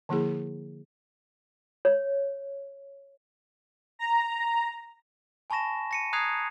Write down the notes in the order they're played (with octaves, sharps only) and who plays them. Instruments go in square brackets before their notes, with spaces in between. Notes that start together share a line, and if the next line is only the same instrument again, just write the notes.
[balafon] D3 F3 A#3 E4 G#4
[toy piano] C#5
[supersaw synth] A#5
[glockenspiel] G#5 A5 B5 C#6 A#6 E7
A#6 C#7 D#7
A#5 D#6 F#6 G#6 C7 F7